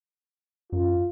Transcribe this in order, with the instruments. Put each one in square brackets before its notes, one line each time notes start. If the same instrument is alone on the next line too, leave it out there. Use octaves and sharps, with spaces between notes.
[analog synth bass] F#2 [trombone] F4